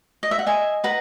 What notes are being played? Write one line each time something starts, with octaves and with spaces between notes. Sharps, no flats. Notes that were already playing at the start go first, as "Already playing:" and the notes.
D#5
E5
F#5
D#5 E5 G#5
B4 F#5 A#5